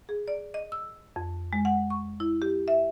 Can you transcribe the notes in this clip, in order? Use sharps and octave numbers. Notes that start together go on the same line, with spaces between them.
G#4
D5
D#5
E6
F2
G#3
F#5
C#6
E4
G4
E5